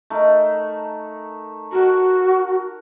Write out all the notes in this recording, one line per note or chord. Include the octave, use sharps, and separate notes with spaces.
A3 D#4 A#4
F#4 A#4 F#5